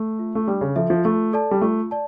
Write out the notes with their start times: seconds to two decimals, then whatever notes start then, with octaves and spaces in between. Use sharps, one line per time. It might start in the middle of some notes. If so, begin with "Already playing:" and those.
Already playing: A3
0.19 F4 A4 E5
0.35 A3
0.47 G3 D4
0.61 C#3
0.76 F3 F4 A4 E5
0.90 F3
1.05 A3 F4
1.33 A4 D5 A5
1.51 G3
1.61 A3 F4
1.91 D5 A5